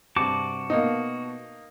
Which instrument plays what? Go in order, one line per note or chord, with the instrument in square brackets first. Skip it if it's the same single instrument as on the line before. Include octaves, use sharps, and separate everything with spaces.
[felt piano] G2 C3 [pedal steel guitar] F#4 A5 D6
[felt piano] B2 B3 [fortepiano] A#3 D#4